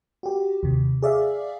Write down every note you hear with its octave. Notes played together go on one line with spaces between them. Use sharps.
F#4 G4
D#2 C3
G#4 D5 E5 F5